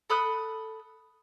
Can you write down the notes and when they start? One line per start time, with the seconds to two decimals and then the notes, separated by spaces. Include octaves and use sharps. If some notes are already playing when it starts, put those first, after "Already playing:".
0.10 A4 B5 D#6 F#6